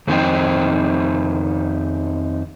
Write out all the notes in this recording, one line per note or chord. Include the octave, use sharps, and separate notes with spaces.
F2 D#3 C4 D#4 C5 G5